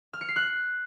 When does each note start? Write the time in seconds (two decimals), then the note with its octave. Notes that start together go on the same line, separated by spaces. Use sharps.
0.13 F6
0.21 C#7
0.28 C7
0.36 F#6